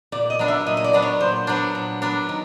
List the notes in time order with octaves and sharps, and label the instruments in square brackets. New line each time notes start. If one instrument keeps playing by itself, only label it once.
[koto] A#2 [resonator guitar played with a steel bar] D5
[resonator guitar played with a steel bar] D#5
[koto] F#3 B3 D4
[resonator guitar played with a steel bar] E5
[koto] A#2 [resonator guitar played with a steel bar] D#5
[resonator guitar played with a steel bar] D#5
D5
[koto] F#3 B3 D4
[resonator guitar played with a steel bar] C#5
[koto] A#2 [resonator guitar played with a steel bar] C5
[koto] F#3 B3 D4
A#2
F#3 B3 D4
D#3